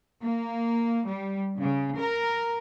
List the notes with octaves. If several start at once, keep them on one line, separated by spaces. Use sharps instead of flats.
A#3
G3
C#3
A#4